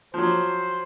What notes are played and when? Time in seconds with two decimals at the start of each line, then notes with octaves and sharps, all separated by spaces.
0.14 F3 F#3 C5